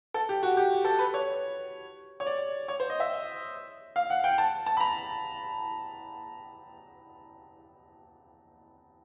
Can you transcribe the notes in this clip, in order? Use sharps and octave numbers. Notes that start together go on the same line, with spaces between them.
A4
G4
F#4
G4
A4
B4
C#5
C#5
D5
C#5
C5
D#5
E5
F5
F#5
G5
A5
A5
B5
A#5